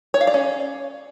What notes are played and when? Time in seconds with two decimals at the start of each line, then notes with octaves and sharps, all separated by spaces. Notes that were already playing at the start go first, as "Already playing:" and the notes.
0.14 C#5
0.21 F5
0.27 D5
0.34 C#4